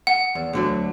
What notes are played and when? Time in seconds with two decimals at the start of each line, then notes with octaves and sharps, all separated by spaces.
0.07 F#5
0.35 E2
0.53 D2 D3 F#3